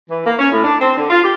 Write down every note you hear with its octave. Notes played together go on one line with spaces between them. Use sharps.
E3
A#3
C#4
A2
D4
C4
D3
F4
G4